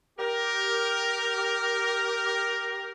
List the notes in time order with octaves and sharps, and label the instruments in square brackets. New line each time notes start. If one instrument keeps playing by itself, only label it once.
[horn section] G4 A#4